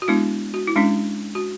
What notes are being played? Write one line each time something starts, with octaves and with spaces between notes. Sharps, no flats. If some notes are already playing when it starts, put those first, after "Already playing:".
F#4
G#3 B3 D4 E4
F#4
E4
G#3 C#4 D4
F#4